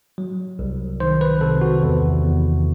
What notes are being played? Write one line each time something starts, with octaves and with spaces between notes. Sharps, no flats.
F#3
C2
D#3 C5
B4
C3 A4
F#4
E2
E2